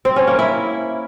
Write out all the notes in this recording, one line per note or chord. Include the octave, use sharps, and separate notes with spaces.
C4
C#4
A#3
E4